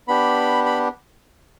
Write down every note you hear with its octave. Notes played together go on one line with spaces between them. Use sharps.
B3 D4 G4 B5
B5